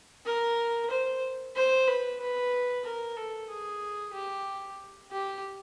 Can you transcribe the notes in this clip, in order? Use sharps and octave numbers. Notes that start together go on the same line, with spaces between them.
A#4
C5
C5
B4
B4
A#4
A4
G#4
G4
G4